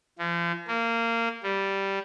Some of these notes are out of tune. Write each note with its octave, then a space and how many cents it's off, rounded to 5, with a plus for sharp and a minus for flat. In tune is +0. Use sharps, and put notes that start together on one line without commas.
F3 -40
A#3 -20
G3 -5